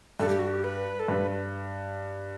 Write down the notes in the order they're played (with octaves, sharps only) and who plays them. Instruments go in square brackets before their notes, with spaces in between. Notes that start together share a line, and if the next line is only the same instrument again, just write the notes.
[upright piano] G2 [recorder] A4
[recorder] G4
F#4
G4
B4
A4
[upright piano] G2 [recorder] B4